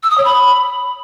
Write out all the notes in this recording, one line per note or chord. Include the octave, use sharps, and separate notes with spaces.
E6
D#6
C#5
B5